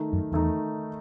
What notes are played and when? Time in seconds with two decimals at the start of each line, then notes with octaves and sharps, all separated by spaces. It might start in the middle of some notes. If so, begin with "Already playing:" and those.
Already playing: D#3 A3 D#4
0.13 F#2
0.32 E2 D#3 A3 D#4